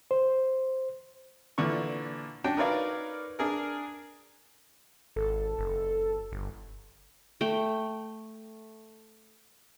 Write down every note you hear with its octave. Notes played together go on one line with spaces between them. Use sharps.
C5
A#2 D3 E3 C#6
C#4 D4 F#4 G5 A5
D#4 A#4 B4 C#5 D5 F5
D4 G#4 A#4
G#1 A4
F#1
G1
A3 G5